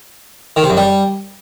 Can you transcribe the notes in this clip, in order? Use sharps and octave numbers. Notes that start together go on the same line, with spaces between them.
D#3
C3
F#2
G3